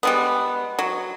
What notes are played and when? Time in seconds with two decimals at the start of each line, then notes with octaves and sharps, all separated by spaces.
0.03 G3 G#3 B3
0.79 F#3